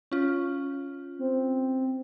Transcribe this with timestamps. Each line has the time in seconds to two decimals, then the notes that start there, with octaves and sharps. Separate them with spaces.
0.11 C#4 F4
1.19 C4